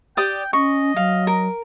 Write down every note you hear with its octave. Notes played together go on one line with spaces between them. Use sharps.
G4 D5 G5 D#6
C#4 D#5 C#6
F#3 F5
A#4